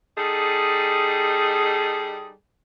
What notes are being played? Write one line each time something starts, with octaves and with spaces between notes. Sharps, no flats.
G3 D#4 G#4 A4